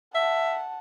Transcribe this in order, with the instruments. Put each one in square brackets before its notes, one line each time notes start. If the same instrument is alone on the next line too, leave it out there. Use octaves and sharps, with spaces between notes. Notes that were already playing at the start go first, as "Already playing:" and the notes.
[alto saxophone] E5 [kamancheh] F#5 A5